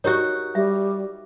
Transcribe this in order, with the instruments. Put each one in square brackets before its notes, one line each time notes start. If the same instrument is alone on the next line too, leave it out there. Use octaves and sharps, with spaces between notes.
[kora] D#4 F#4 [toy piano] G4 A#4 C#5
[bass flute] G3 [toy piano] E5